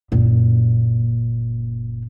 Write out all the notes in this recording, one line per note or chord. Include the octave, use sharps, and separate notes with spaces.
F#1 A#2